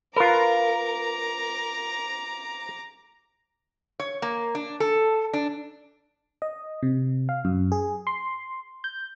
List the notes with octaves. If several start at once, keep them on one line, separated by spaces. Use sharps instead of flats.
F4 A#4 B4 A#5 D6
C#5
A#3
D4
A4
D4
D#5
C3
F5
F#2
G#4
C6
G6